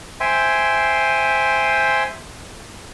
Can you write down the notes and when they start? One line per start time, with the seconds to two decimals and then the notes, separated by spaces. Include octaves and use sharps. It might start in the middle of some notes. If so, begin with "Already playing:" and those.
0.20 C5 E5 G5 G#5 C6